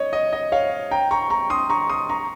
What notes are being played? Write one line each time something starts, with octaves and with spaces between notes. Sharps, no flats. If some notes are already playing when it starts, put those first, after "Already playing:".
Already playing: C#5 D#5
D#5
D#5
C#5 F5
G5 A#5
A#5 C#6
A#5 C#6
C6 D#6
A#5 C#6
C6 D#6
A#5 C#6